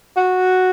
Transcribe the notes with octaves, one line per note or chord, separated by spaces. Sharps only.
F#4